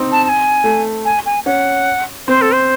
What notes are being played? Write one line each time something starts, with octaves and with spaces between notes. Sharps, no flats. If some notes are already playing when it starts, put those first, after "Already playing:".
Already playing: C4 D#4
A5
A5
G#5
A3
G#5
G#5
C#4 F#5
C4 C5
A4
C5